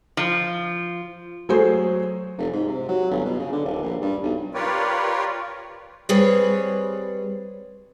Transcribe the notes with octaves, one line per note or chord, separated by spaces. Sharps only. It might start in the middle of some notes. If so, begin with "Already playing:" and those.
F3
F#3 A3 G#4 C5
F1
G#2
C3
F#3
G1
B2
C#3
D3
D#1
A#1
G2
B1
F4 G4 A#4 B4 C#5 D5
G3 C4 G#4 B4 C#5